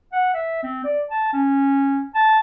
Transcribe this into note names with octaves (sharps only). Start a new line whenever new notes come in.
F#5
E5
C4
D5
A5
C#4
A5